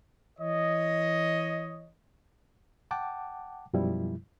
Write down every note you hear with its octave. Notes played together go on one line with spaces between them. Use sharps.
E3 C#5 D#5
F#5 G5 A5 D6
F#2 B2 F3 G3 E4